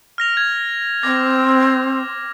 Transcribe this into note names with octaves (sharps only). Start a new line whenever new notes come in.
F6 A#6 F7
G#6
C4 D6 G#6 A#6